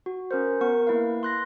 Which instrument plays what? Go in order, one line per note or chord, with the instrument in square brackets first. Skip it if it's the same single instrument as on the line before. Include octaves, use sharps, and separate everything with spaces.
[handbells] F#4
C#4 A#4 C5
B3 A#4 C#6
A#3 E4 B4 F5
C6 F#6 A#6